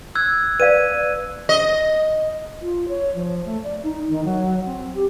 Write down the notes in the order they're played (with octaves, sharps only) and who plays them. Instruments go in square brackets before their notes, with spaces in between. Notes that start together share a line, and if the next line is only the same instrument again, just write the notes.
[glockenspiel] E6 F#6 G#6
[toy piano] B4 D5 F5 [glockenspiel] D#7
[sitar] D#5
[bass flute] F4
C#5
F3
A3
D5
D#4
D#3
F#3
C4
G4